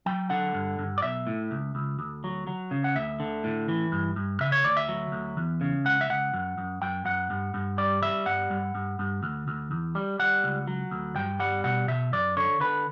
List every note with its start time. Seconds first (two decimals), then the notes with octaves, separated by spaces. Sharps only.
0.06 F#3 G5
0.30 D3 F#5
0.54 G2
0.79 G2
0.98 D5
1.02 B1 E5
1.27 A2
1.51 C#2
1.75 C#2
1.99 D2
2.24 F#3
2.47 F#3
2.71 C#3
2.84 F#5
2.96 D2 E5
3.20 D3
3.44 A2
3.69 E3
3.92 G2
4.16 G2
4.40 C#3 E5
4.52 C#5
4.64 D2 D5
4.77 E5
4.89 F#3
5.12 D2
5.37 E2
5.61 C#3
5.85 C#2 F#5
6.01 E5
6.10 C#2 F#5
6.34 F#2
6.58 F#2
6.82 F#2 G5
7.05 F#2 F#5
7.30 G2
7.54 G2
7.78 G3 D5
8.02 G3 E5
8.26 G2 F#5
8.50 G2
8.75 G2
8.99 G2
9.23 D2
9.48 D2
9.71 E2
9.95 G3
10.19 G3 F#5
10.44 C#2
10.67 F#3
10.91 D2
11.15 G2 G5
11.40 G3 F#5
11.64 B2 F#5
11.88 B2 E5
12.13 F#2 D5
12.37 D3 C#5
12.60 D3 B4